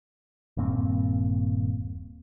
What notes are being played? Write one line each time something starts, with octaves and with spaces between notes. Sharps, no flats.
D#1 G2 A#3 C4